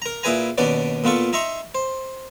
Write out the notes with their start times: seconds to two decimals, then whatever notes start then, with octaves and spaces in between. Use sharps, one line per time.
0.02 A#4 A#5
0.23 A#2 E4 G#4 B4 G#5 A#5
0.58 D#2 B2 B3 C#4 D4 D5
1.04 A#2 B3 F4 A4 C#6
1.33 D#4 E5 A#5 C6 C#6
1.75 C5